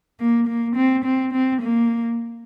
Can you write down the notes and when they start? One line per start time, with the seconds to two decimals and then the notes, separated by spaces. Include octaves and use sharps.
0.20 A#3
0.48 A#3
0.76 C4
1.05 C4
1.33 C4
1.62 A#3